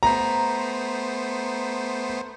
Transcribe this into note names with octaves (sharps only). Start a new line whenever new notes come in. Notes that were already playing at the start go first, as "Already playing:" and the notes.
A3 B3 C5 A#5